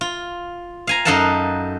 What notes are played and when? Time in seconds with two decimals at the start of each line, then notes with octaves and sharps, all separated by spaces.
0.01 F4
0.87 F5 G#5 A#5
1.05 F#2 D#4 A4 F5 F#5 A5